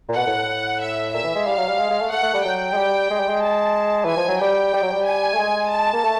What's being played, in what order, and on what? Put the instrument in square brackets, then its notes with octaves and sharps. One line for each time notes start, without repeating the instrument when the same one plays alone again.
[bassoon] A#2
[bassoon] B2 [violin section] F#5
[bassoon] A2
A2
[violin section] E5
[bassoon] A#2 [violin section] E5
[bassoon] E3
G#3
[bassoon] G3 [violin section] F5
[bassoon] F#3
G3
G#3
G#3
A3
[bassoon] A3 [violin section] F#5
[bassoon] A3
G3
[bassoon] F#3 [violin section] G5
[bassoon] G#3
G3
G#3
G3
G#3
[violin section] A5
[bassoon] E3 [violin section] G#5
[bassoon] F3
F#3
[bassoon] G3 [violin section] G5
[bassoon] G3
F#3
G3
[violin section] G#5
[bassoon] A3
G#3
[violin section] A5
[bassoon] A#3
A3